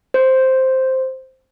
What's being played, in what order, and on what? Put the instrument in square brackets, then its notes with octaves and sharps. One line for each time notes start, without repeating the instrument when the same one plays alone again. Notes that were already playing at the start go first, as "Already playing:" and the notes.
[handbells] C5